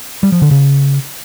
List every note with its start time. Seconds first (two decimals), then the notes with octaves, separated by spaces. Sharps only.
0.23 G3
0.32 F3
0.42 D3
0.51 C#3